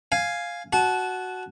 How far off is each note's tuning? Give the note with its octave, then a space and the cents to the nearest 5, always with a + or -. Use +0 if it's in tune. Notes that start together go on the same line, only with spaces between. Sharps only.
F5 +0 G#5 +0
F#4 +0 A5 -25